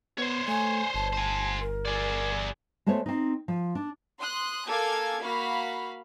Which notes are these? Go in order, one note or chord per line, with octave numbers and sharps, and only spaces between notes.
B3 C5 C#5
A3 G#5
G1 A5
C5 G#5
A#4
G#4 D5
G#3 A3 B3 C5 C#5
C4 D#4
F3
D4
C6 D#6 F#6
A#3 A4 F5 G#5 D6 G#6
A#3 F#4 F5 B5